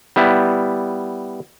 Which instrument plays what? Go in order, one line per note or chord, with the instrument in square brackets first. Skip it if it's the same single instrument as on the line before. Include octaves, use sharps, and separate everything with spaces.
[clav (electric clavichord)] G3 B3 E4